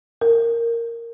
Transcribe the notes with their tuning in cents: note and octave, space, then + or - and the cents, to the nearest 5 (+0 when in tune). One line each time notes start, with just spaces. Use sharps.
A#4 -10